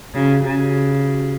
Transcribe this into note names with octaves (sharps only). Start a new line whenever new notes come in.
C#3 F#4
G4
C#3 F#4